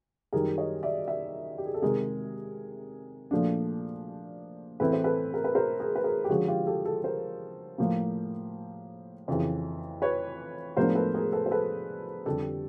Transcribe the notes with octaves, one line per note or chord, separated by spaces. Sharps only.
F#2 D#3 G3 G#4 A#4
C#5 D#5
D5 E5
D5 E5
G4
G#4
A4
C3 D#3 G#3 G#4 A#4
A#2 F3 A3 D4
A2 E3 A3 C4 E4 B4
C5
A4 B4
A#4
B4
A#4 C5
G#4 A#4
B4
G#4 A#4
G4
D3 F3 G#3 C#4 F#4 G#4
F4 G4
G4 A4
G4 A4
A#4 C5
A2 F3 A#3
F2 C#3 E3
B4 C#5
A2 F3 G#3 B3 D4 A#4 C5
A4 B4
G#4 A#4
A4 B4
C5
A4 B4
F2 D3 G3 G4 A4